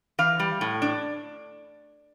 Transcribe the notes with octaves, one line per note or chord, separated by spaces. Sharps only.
E3 F5
G3
A2
D4